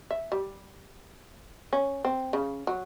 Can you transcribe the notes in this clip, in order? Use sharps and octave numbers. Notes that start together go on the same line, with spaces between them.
E5
G3
C#4
C4
C#3
F#3